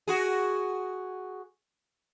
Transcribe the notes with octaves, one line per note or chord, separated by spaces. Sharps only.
F#4 G#4